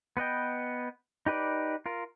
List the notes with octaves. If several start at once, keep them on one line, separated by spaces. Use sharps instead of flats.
B3 B4 D#5 G5
D#4 G4 B4 D5
F4 A#4